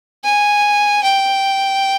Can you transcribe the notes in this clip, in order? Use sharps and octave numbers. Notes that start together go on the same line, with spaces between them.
G#5
G5